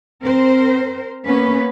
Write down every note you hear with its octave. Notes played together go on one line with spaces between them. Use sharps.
C4 A#4 C5
A#3 B3 C#4 B4